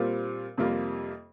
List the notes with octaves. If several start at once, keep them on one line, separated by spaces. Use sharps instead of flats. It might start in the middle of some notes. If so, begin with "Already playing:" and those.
Already playing: A#2 G3 C4 F4
F2 C3 G3 A#3 F4